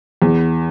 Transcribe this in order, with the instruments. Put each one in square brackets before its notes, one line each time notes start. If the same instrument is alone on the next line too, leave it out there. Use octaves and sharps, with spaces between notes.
[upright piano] E2